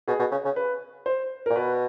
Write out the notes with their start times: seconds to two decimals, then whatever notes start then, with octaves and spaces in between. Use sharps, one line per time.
0.08 B2 G#4
0.19 B2
0.31 C#3
0.45 C#3
0.56 B4
1.06 C5
1.46 A#2 A#4
1.56 B2 B4